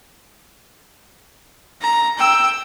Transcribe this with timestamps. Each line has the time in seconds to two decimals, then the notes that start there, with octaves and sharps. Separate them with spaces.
1.81 A#5
2.18 G5 E6